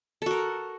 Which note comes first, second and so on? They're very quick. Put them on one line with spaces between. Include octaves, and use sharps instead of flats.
A4 F#4 A#4